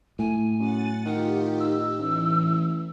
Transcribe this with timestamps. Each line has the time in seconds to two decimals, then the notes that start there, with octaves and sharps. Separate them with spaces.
0.19 A2 G#5
0.60 F#2 F#5 A6
1.06 D#3 F4 G4 F#5
1.60 D#4 E6
1.99 A1 E3